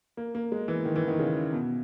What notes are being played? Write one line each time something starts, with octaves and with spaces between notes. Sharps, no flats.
A#3
A#3
G#3
E3
D#3
E3
D#3
C#3
B2